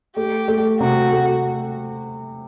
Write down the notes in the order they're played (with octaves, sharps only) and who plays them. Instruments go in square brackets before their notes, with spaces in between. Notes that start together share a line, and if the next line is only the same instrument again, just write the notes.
[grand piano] A3 [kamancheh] G4
[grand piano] A3
[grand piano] C3 [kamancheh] F#4
[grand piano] A3